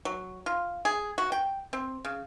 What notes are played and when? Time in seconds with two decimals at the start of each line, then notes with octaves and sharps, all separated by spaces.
0.05 F#3
0.46 F4
0.85 G#4
1.18 F#4
1.32 G5
1.73 C4
2.05 C#3